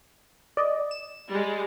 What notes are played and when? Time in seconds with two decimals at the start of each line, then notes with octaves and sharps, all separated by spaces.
0.57 D5 D#5
0.91 E7
1.29 G3 G#3